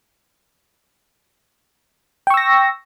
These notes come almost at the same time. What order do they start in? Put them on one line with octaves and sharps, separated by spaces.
G5 C#6 E6 A#6